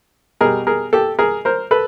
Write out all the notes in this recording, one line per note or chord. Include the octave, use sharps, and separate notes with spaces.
B2 G3 G#4 A#4
G#4 A#4
G4 A4
G#4 A#4
A#4 C5
A4 B4